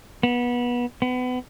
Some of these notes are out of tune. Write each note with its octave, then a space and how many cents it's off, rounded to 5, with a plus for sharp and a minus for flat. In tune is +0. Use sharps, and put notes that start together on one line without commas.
B3 -25
B3 +30